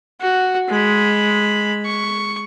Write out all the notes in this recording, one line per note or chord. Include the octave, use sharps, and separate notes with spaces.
F#4
G#3 B5
C#6